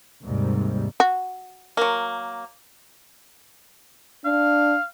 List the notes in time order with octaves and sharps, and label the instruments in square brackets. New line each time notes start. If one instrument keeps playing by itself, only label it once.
[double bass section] D#2 G#2 C3 G3
[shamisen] F#4
[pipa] F#3 A#3
[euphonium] D4 [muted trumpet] F5